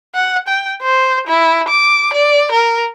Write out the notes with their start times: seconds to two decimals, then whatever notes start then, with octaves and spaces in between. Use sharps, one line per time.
0.15 F#5
0.48 G5
0.82 C5
1.27 E4
1.68 D6
2.13 D5
2.52 A#4